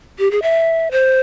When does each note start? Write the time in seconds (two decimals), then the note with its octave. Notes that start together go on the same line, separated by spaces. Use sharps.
0.19 G4
0.31 G#4
0.42 E5
0.91 C5